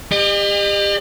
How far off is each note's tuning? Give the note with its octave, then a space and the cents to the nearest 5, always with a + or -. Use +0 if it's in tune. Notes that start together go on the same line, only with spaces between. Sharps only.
G4 +35 D#5 -40